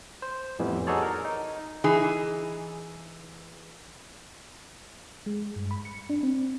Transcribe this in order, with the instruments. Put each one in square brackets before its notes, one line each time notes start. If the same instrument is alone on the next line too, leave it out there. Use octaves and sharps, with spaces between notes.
[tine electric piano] C5
F2 A2 E3 G3 B3
D#4 F#4 G#4 A4 C#5 D5
A#4
D#4
[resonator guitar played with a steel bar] E3 D#4 G#4
[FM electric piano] G#3
G2
B5
C#7
D4
C4